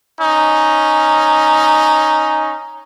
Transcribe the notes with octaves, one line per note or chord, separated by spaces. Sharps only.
C#4 D#4